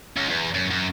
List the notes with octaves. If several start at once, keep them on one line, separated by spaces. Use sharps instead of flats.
C#2
E2
F#2
F#2